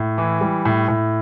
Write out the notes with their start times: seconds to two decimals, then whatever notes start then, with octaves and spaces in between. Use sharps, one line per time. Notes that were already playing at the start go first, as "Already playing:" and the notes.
Already playing: A2
0.18 E3
0.41 G3
0.65 A2
0.88 A2